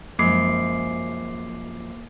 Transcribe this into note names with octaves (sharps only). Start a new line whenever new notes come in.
F#2 F3 G#3 A#3 D6 C7